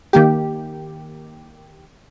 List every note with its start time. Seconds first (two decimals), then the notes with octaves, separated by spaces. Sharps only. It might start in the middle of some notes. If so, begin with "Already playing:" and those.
0.13 D#3 A#3 G4